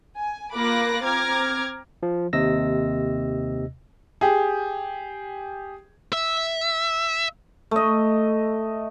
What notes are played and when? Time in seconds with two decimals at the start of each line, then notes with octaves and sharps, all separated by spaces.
0.16 G#5
0.54 A#3 F4 B5 D6 F#6 A#6
1.04 C4 A#5 D6 F6 G#6
2.03 F3
2.33 D#2 C3 D#5 E6 A#6
4.21 G4 G#4
6.13 E5
7.71 A3 D#5